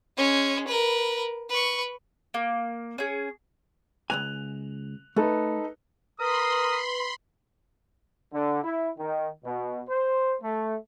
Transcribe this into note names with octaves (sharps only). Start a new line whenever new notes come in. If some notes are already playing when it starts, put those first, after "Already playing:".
G#3 C#4
A#4 B4
B4 C#6
A#3
C#4 G#4
C#2 F#3 G#5 F#6 F7
A3 D#4 A4 B4
A#4 B4 B5 C6 D#6
D3
E4
D#3
B2
C5
A3